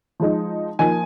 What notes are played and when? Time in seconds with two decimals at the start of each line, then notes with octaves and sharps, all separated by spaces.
0.20 F3 G#3 D#4
0.79 F3 A#3 D#4 G#5